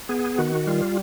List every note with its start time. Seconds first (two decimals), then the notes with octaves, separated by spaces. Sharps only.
0.09 B3 G#4
0.38 D#3 F#4
0.67 G3 F4